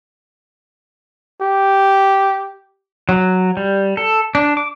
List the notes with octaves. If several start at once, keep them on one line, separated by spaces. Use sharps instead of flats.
G4
F#3
G3
A4
D4
D6